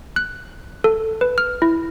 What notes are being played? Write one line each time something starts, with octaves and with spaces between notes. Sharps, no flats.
F#6
A4
B4
F6
E4